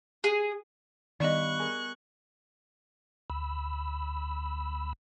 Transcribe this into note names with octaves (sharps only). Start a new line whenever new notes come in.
G#4
G2 D#3 B3 D5 D#5 B5 C#6 F#6
G#4 A#4 G#5
D2 B5 E6